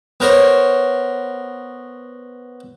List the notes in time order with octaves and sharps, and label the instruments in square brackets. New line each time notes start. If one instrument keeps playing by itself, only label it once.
[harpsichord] B3 A#4 C5 C#5